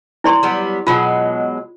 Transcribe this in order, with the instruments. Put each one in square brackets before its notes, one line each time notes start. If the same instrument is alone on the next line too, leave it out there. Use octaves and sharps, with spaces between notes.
[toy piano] E4 D5 C6
[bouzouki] F#3 G3 B3
[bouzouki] B2 F#3 G#3 [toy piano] F4